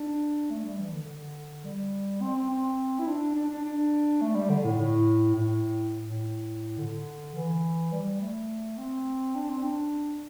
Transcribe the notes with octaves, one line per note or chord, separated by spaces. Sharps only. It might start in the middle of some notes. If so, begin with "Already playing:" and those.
Already playing: D4
A3
G3
E3
D3
D3
G3
C4
C4
C4
E4
D4
D4
D4
D4
A3
G3
D3
A2
A2
A2
A2
D3
E3
G3
A3
C4
D4
C4
D4